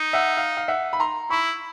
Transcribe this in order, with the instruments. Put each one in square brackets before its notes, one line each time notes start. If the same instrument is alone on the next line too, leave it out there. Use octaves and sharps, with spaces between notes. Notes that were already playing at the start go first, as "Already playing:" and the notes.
Already playing: [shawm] D#4
[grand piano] E5 F#5
F5
F5
E5 F#5
B5
A#5 C6
[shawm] E4 [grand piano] B5 C#6